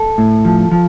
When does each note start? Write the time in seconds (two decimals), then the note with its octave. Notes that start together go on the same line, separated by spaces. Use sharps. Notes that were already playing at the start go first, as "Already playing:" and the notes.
Already playing: A4
0.18 A2
0.45 F3
0.72 F3